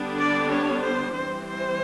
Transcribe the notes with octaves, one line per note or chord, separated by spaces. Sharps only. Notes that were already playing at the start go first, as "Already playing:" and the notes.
Already playing: D3 G3 B3 D4
D5
C#5
C5
E3 G3 C4 C5
C5